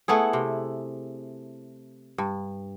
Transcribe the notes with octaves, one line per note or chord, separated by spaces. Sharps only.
A3 B3 E4 G#4
C3
G2